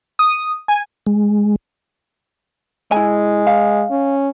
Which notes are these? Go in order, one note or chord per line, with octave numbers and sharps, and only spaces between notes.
D#6
G#5
G#3
G#3 E4 G#5
F5
C#4